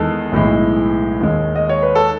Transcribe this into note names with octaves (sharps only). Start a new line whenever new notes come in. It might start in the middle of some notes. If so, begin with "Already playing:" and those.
Already playing: E2 D#3 G#3 A4
B1 A2 E3 G#3
D#2 D#3 G#3
D#5
C#5
B4
A4